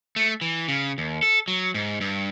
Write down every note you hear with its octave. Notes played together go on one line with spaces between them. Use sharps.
A3
E3
C#3
D#2
A4
F#3
G#2
G2